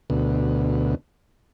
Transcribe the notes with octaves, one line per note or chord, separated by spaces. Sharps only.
D2 B2